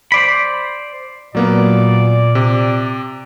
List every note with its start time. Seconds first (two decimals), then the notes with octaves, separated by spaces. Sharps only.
0.12 C5 D5 B5
1.35 A#2 F#3 A#3 B3 D5
2.35 C3